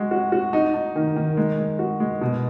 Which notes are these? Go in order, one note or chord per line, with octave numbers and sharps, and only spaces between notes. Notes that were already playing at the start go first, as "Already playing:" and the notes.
Already playing: G#3 F#4
F#4
F#4
D#4
D#4
D#3
D#3
G#3
G#3
F#4
G#3
B2